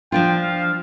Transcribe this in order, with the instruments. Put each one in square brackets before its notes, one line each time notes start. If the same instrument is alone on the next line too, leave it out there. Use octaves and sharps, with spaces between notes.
[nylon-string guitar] F3 D4 F4 [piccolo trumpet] G5
[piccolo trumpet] F5